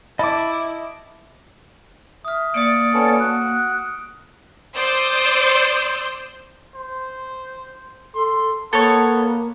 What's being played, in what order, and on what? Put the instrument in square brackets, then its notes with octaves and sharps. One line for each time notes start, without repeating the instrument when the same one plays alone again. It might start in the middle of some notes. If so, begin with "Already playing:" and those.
[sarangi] E4 [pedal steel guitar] D#5 D6 [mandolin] A5 [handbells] B5
[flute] E5 [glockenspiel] D#6 F6
[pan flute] A#3 [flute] D5 [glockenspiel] D#6 C#7 D7
[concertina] B3 C#4 A4
[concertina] F#4 [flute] F#6
[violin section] C5 D5 C6 D#6 E6 G6
[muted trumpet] C5
[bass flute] A4 [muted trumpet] C6
[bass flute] A#3 [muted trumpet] B3 [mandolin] A4 C#5